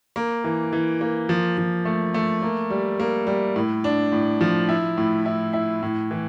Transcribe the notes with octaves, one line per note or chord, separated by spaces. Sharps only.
A#3
E3
E3
A#3
F3
F3
A3
A3
A#3
G3
A#3
G3
A2
D4
A2
F3
E4
A2
E4
E4
A2
E3